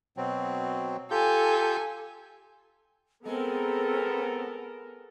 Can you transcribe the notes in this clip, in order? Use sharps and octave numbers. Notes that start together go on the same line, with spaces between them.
B2 F#3 C4
F4 G4 A4 G#5 G6
G#3 B3 C4 A4 A#4